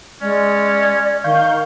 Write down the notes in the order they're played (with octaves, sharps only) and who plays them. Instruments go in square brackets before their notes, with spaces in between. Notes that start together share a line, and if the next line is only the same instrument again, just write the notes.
[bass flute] G#3 [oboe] C#4 [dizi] D5
[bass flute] D#3 [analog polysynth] F5 C#6 G6